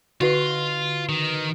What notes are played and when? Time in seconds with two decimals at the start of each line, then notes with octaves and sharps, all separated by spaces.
0.21 D3 F4 F#4 B4 G7
1.09 D#3